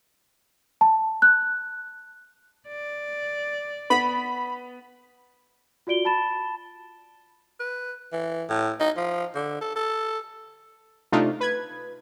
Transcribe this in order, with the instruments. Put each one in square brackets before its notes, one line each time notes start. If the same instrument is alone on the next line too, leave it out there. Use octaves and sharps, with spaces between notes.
[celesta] A5
F#6
[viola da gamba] D5
[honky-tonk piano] B3 [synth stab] B5
[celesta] F4 F#4 D5 D7 G7
A5 B5 A6 E7
[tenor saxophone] B4
E3
A2
D#4
F3
D3
A4
A4
[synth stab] C3 A3 D4 D#4 F4
B4 G#6